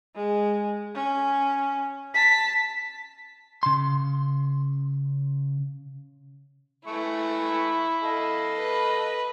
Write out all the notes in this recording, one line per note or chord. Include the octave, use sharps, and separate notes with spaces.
G#3
C#4
A5 B6
C#3 C6
E3 A3 E4 C#6
A4 D#5 F5
B4